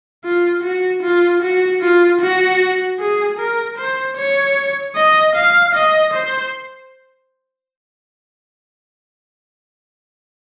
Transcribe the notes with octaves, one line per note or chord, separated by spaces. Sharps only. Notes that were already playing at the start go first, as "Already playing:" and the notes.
F4
F#4
F4
F#4
F4
F#4
G#4
A#4
C5
C#5
D#5
F5
D#5
C5